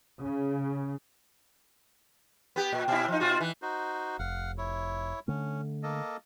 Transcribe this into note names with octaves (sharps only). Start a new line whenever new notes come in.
C#3
B3 G4
A#2
B2 E4
F3 D#4
B2 F4 F#4
E3
D#4 F#4 C5
F1 F5 F#5
E4 C#5
D3 A3 C#4
A#3 A4 D#5